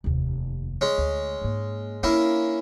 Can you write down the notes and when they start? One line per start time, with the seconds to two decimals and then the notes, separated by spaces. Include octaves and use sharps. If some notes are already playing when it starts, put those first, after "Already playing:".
0.04 F1 D#2
0.81 G#3 C#4
0.98 D2
1.42 G#2 A#3
2.03 A#3 C#4 D4 E4